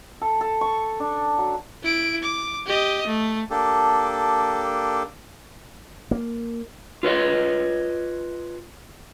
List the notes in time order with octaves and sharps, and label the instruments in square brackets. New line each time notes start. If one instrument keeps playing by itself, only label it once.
[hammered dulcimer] A4
A4
C#6
D4
F#3
[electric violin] E4 D7
D6
G4 D#5
A3
[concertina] A#3 D4 G4 A4
[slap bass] A#3
[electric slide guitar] F4 B4 C#5 D#5